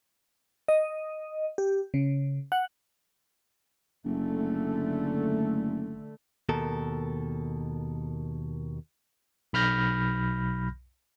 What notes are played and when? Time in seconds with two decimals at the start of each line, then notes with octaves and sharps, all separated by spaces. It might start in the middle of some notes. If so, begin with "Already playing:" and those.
0.68 D#5
1.58 G4
1.94 C#3
2.52 F#5
4.05 F#1 D3 A3
6.49 D#2 B2 A4 A#4
9.53 B1 B5 F6 G6 A#6